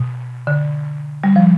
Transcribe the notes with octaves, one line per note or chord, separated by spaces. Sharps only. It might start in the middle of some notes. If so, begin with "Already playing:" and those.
Already playing: B2
D3
G3
F3